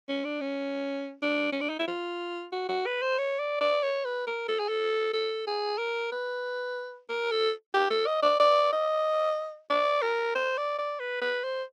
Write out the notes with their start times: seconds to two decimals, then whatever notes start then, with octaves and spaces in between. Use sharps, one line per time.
0.09 C#4
0.25 D4
0.41 C#4
1.22 D4
1.52 C#4
1.61 D4
1.69 D#4
1.79 E4
1.87 F4
2.52 F#4
2.69 F#4
2.86 B4
3.02 C5
3.18 C#5
3.39 D5
3.61 D5
3.83 C#5
4.05 B4
4.27 A#4
4.48 A4
4.59 G#4
4.69 A4
5.14 A4
5.47 G#4
5.78 A#4
6.12 B4
7.09 A#4
7.31 A4
7.74 G4
7.90 A4
8.07 D#5
8.23 D5
8.40 D5
8.73 D#5
9.70 D5
10.02 A#4
10.35 C5
10.57 D5
10.78 D5
11.00 B4
11.21 B4
11.44 C5